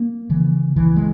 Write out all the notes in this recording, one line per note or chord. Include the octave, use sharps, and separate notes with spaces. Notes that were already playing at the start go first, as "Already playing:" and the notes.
Already playing: A#3
C#3 E3
C#2 E3
G#3